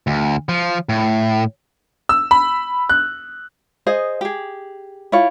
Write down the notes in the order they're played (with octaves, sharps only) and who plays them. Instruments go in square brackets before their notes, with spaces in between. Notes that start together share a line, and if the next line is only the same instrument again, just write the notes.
[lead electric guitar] D2
F3
A2
[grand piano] E6
B5
F#6
[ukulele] G#4 C5 D#5
G4 G#4
E4 F4 C#5